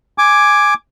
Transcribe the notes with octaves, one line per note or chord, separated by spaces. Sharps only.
G#5 D6